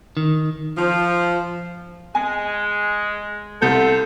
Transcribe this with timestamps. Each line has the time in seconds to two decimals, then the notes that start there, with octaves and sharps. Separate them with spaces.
0.17 D#3
0.77 F3
2.15 G#3 G#5
3.62 C2 F4 A4 C5 E5 G6